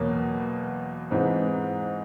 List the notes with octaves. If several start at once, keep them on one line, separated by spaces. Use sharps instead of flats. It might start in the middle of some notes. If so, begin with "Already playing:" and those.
Already playing: E2 B2 F#3 A#3
G#2 E3 G#3 C4 D#4